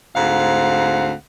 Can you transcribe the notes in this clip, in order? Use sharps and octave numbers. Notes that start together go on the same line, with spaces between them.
D2 G#2 C4 F5 F#5